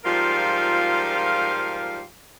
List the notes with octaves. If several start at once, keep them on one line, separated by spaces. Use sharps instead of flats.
G#2 F3 G3 F4 A#4 F5